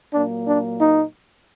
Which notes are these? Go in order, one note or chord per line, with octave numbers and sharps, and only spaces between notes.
A#2 F#3 A#3 D4
D4
D#4